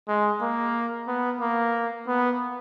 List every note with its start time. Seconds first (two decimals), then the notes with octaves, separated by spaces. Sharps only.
0.08 G#3
0.41 A#3
1.07 B3
1.41 A#3
2.07 B3